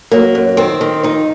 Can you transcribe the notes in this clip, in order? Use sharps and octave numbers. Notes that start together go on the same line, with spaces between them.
F#3 A#3
F#2
D#3 C4
D#3
F2 D#4